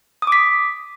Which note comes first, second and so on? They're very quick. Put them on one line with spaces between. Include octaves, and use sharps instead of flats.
D#6 D6 B6